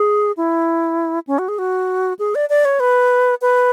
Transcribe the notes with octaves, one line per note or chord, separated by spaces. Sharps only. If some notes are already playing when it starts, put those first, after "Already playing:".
Already playing: G#4
E4
C#4
F#4
G#4
F#4
G#4
D5
D5
C#5
B4
B4